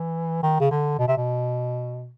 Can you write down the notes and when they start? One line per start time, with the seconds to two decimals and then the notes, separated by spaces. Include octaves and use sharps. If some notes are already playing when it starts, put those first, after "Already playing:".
Already playing: E3
0.43 D#3
0.60 C#3
0.71 D3
0.99 B2
1.08 C3
1.17 B2